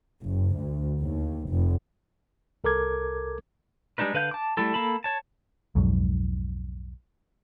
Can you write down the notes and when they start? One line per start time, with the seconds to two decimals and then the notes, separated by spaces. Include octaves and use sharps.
0.24 F#1
0.57 D2
1.02 D#2
1.48 F1
2.64 C2 A4 A#4 D6 G#6
3.98 G3 G#3 D4 D#4 B4
4.14 D3 B4 F5 G6
4.31 A5 D6
4.57 G3 A3 E4 A4
4.74 A#3 A4 A5 B5
5.04 C#5 A5
5.75 B1 F2 G#2 F#3